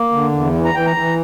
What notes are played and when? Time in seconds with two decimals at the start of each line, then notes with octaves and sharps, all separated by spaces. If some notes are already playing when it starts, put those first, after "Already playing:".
Already playing: A#3
0.11 D3
0.31 E2
0.54 E3
0.65 A#5
0.74 E3 G5
0.86 A#5
0.96 E3